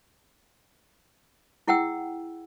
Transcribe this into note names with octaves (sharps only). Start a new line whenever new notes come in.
E4 G#4 F#5 G5 E6